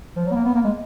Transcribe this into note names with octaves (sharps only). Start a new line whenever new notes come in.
F3
F#3
B3
A#3
B3
A#3
G#3